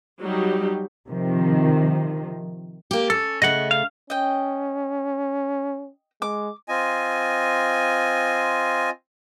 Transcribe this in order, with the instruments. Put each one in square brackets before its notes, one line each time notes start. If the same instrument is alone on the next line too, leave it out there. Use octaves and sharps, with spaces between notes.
[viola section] F#3 G3 D#4 G4
[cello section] C3 D#3 F3
[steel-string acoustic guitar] A#3 G4
[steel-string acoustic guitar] C#4 [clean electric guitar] A4
[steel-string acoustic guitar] C#3 A3 [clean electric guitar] D#5 F#5
[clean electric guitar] F5
[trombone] C#4 [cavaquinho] D#5 G5
[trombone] G#3 [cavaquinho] D6
[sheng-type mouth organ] C4 F4 D#5 G#5